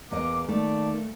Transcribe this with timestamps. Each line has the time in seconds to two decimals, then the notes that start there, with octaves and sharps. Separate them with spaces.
0.11 E2 A#3 D#5 D6
0.48 D#3 A3 A#3 D5 A5